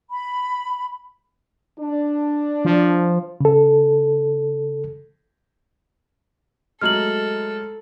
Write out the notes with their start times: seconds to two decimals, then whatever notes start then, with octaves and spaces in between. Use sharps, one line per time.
0.10 B5
1.79 D4
2.65 F3
3.41 C#3 A4
6.81 F#3 G#3 A3 A4 F6 F#7